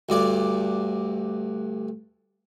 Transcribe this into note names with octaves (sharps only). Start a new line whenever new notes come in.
D2 G2 D5